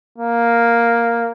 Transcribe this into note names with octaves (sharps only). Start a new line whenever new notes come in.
A#3